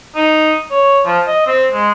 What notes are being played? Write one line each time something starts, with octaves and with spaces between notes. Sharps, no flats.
D#4
C#5
F3
D#5
C4
G#3